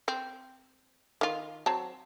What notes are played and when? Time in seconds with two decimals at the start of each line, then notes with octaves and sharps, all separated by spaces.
0.08 C4
1.21 D#3 F4
1.66 F#3 C4 A5